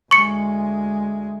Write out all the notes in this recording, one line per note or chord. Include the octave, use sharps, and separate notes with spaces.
D2 G#3 C#6 C#7